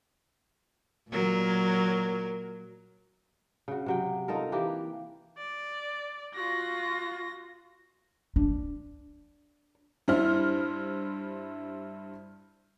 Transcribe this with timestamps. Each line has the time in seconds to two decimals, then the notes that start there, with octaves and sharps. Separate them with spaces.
1.10 A#2 F#3 A#4
3.68 C#3 F#4
3.86 C3 F#3 G5
4.28 D#4 F4 A4 A#4
4.52 E3 A#3 G4
5.38 D5
6.35 F4 F#4 A#6
8.36 D4
10.08 G2 E4 C5 F6